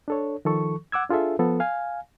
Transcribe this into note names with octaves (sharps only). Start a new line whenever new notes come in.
D4 A4 C#5
D#3 F3 A4 C#6
F#5 D6 E6 G#6
D4 F4 G#4 A4 E5
F3 B3 A4
F5 G#5